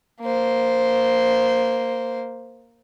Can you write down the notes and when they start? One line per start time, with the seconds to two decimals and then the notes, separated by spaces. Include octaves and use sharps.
0.21 A#3 C5